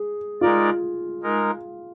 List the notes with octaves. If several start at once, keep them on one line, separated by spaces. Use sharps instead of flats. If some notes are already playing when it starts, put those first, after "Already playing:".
Already playing: G#4
G#3 D#4 F4 A#4 D5
G#3 D#4 A#4